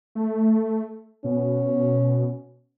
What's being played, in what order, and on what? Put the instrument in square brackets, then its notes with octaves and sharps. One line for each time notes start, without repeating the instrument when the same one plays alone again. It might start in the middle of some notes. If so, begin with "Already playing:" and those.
[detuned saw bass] A3
[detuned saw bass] B2 [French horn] C#4